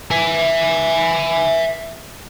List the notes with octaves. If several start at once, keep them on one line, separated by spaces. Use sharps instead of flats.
E5 G#5